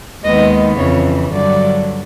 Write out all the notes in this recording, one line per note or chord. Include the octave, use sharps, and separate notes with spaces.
D#2 D#3 G#3 B3 D#5
F2 C#3 E3 C#5
G2 D3 F#3 D5